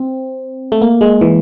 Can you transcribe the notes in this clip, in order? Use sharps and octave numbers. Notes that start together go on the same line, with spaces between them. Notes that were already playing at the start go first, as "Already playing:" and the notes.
Already playing: C4
A3
A#3
G#3
E3